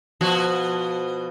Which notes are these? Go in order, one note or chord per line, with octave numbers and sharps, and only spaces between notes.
B2 F3 F#4